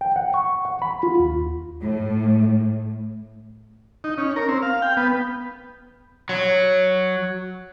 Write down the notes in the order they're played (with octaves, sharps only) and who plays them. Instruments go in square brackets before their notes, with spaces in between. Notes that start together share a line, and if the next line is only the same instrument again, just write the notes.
[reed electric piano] G5
F#5
C#6
F#5
B5
F4
D#2
[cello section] A2
[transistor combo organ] D#4
C#4
A#4
C4
F5
G5
B3
[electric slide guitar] F#3